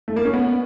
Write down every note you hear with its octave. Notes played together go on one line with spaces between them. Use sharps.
A3
A#3
C#4
B3